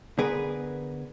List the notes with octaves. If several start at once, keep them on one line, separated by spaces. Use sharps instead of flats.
D3 B3 G#4 A#4 B4